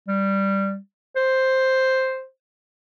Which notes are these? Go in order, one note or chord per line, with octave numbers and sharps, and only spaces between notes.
G3
C5